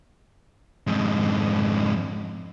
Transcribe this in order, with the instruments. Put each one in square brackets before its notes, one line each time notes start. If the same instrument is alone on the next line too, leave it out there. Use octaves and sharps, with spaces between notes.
[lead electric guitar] F2 G#2